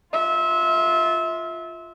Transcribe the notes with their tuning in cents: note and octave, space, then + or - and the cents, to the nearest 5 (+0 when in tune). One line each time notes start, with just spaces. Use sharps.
F4 +0 E5 -25